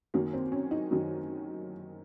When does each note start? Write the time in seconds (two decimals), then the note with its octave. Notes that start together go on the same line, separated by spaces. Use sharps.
0.14 F#2 D#3 F#3 A#3
0.33 C4
0.52 C#4
0.71 D#4
0.90 F#2 D#3 F#3